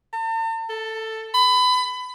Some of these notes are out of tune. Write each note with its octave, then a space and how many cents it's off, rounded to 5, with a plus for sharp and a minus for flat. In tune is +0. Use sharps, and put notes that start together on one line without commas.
A5 +45
A4 +10
B5 +25